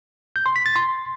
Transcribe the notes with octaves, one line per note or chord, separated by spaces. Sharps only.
G6
C6
B6
A6
C6